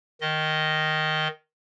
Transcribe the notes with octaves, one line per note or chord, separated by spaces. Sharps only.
D#3 D#5